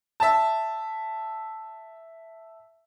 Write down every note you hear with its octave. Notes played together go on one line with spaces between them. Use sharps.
E5 A5